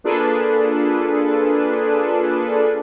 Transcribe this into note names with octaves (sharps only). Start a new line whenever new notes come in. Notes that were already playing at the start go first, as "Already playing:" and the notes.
A#3 D4 F4 G#4 A4 B4